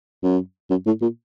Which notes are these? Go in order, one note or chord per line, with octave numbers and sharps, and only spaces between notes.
F#2
F#2
A2
A#2